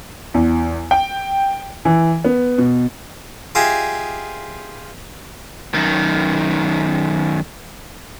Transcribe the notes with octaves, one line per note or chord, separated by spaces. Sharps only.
E2
G5
E3
B3
B2
F4 G4 G#4 D#5 E5 G#5
F#2 D#3